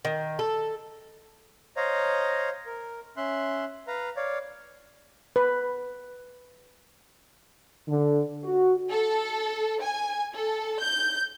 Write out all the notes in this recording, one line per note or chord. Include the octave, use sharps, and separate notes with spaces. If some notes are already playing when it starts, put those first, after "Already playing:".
D#3
A4
C5 C#5 D#5 F5 A#5
A#4
C#4 E5 C6 F#6
B4 F5 A#5
C#5 D5 F5
B4
D3
F#4
A4
G#5
A4
G6